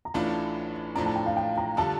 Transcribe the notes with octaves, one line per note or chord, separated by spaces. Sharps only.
A#5
A1 A2 A3 D4 F4 A5
A2 F3 A3 D4 A#5
A5
G5
F5
G5
A#5
D3 G3 D4 F4 A4 A5